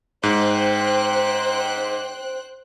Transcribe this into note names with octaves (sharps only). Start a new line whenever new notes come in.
G#2 C5 G5 F#6